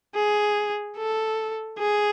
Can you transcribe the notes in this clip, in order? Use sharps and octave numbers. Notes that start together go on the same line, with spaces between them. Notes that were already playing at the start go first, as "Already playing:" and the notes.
G#4
A4
G#4